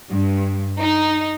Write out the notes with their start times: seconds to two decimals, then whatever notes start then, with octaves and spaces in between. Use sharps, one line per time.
0.10 G2
0.79 D#4